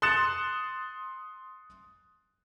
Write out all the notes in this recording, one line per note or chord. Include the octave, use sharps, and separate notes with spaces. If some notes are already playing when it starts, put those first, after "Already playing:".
C6 D#6 F#6 A6 C#7 E7